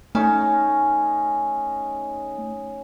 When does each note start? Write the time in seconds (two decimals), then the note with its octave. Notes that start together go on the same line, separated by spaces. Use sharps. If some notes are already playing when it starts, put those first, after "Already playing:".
0.15 A3 C#4 D#4